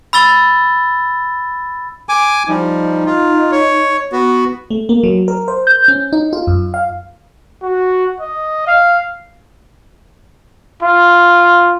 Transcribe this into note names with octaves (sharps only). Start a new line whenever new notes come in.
B5 E6 A6 G7
G#5 D6
F3 G3 D#4
F4
C#5
B3 F#4
A3
A#3
F#3
A#4
C5
G6
C#4
D#4
F4
F#2
F5
F#4
D#5
F5
F4